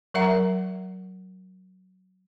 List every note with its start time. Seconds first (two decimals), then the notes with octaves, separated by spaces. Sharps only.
0.14 F#3 A#4 E5 F#5 A#5